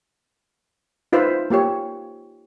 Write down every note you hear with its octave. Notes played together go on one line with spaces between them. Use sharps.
D#4 F4 B4 C5 E5
A#3 F4 G4 C#5